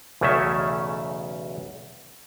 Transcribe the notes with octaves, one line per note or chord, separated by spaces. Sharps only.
B1 E2 C#3 A3 C#4 E5